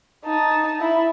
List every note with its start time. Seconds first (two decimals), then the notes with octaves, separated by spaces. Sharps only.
0.25 D#4 A5
0.81 E4